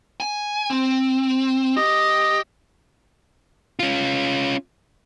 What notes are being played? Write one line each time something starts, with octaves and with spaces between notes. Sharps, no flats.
G#5
C4
G4 D#5
C#4 F4